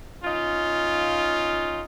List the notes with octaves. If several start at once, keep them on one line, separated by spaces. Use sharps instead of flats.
C#4 D#4 F4